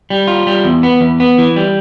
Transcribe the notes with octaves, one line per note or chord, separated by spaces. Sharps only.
G3
F4
G3
E2
B3
E2
B3
E3
G3